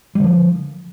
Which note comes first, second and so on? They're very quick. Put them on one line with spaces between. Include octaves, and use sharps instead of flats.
G3 D3 F3